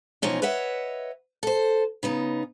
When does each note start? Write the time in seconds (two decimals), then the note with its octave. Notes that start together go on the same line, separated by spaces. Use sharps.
0.22 B2 E3 F3 C#4 D#4
0.42 B4 C#5 D#5 E5 F#5
1.43 A4 C5
2.03 C#3 B3 D#4